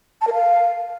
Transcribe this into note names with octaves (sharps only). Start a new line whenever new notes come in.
A5
A#4
F5